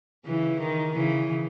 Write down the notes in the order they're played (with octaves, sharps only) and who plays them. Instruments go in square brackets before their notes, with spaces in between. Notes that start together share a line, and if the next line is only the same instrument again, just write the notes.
[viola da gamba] C#3 E3
D#3
C#3 E3